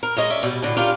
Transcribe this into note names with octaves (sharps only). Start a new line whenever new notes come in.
A#4
G#3 C#5 D#5
C#4 D5 E5
B2 G3
A2 D3
C#4 D4 F4 G4 A#4